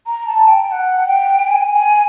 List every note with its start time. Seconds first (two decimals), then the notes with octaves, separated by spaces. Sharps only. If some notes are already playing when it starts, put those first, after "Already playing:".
0.06 A#5
0.27 A5
0.47 G5
0.67 G5
0.72 F#5
1.07 G5
1.47 G#5
1.74 G#5